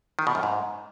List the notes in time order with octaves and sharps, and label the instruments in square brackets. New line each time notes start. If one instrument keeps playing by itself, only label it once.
[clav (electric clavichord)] D#3
B2
F#2
G#2